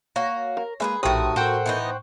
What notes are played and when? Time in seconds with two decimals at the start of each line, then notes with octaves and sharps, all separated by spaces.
0.16 A#3 F#4 C#5 A#6
0.57 A#4
0.80 G#3 A#3 G#4 B4 E5
1.03 A#1 A2 D#3 F#4 G4 C5 D#6
1.36 A2 F#4 A4 A#4 C5 F#5 G5 C#6
1.66 E3 B3 D#4